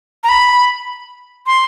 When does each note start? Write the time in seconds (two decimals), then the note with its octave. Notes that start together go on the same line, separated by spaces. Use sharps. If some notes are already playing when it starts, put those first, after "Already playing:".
0.24 A#5
0.29 B5
1.47 C6